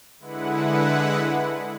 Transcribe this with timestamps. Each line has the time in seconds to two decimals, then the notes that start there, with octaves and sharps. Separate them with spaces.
0.19 D3 G#3 E4 B4 F#5